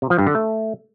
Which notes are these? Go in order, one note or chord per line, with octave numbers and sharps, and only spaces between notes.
C3
F3
G2
D3
A3